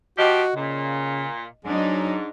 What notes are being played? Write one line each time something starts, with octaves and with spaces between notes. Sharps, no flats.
F3 F#4 G4 D#5
A#2 C#3
G#2 F#3 D4 D#4